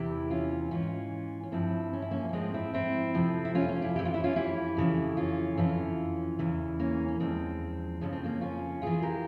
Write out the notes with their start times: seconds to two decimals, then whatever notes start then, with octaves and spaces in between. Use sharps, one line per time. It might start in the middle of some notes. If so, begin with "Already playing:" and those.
Already playing: E2 C3 E3 E4 G4
0.30 C#4 F4
0.71 G#2 E3 C#4 F4
1.43 C#4
1.52 G2 F3 C4 E4
1.93 C#4
2.02 E4
2.11 A#3 C#4
2.29 C#4
2.33 G#2 F3 G#3 C4
2.54 C4 E4
2.74 C4 E4
3.14 F2 C3 F3
3.45 E4
3.55 C#4 F4
3.68 C#4 F4
3.82 E4 G4
3.96 F2 E3 G4
4.05 F4
4.14 E4
4.24 C#4 F4
4.36 E4 G4
4.77 F2 C#3 E3
5.17 C#4 F4
5.57 F2 E3 C#4 F4
6.39 E2 C#3 E3
6.79 A#3 C#4
7.08 C#4
7.20 E2 C#3 F3 G#3 C4
8.01 F2 C#3 F3 C#4
8.12 C4
8.24 A#3 C#4
8.41 C#4 F4
8.82 F2 E3 F4 G#4
9.02 G4 A#4